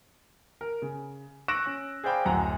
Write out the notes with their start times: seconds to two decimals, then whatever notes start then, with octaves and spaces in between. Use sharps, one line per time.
0.61 A#4
0.82 C#3
1.48 C#6 E6 F#6 A#6 D7 E7
1.66 C#4
2.03 G#4 C5 D5 F5 G5 B5
2.25 D1 F#2 F#5 A#5